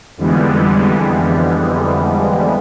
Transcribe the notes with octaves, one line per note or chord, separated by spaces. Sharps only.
F2 D3 E3 G3 G#3 B3